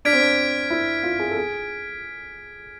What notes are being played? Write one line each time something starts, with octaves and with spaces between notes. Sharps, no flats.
D4 F6 G#6 B6 D7
C4
D4
E4
F4
G#4
A4
G#4